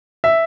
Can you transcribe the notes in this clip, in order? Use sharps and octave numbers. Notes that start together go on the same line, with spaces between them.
E5